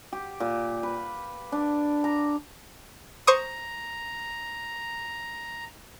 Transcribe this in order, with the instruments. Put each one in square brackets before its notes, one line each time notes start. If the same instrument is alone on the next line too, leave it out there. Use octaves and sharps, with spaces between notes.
[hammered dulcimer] G4
A#2
B4
D4
A#5
[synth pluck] C5 C#6 D#6 [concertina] A#5